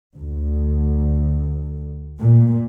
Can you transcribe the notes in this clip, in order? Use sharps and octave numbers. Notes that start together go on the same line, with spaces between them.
D2
A#2